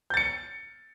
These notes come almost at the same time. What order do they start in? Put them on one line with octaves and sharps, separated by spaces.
G6 A6 C#7